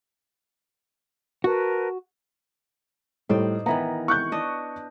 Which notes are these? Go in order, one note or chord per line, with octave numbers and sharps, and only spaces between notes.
F#4 A#4 B4 A5
A2 G3 D#4 C5 D5
D#3 E3 B3 A#5
C#6 F#6 G6
D4 D#5